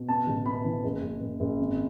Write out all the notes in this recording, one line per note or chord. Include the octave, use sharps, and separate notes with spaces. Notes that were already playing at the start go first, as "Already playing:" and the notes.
Already playing: B2
B3 A5
A1
B3 B5
E3
F#1
F#1
F#1
F#1
G#1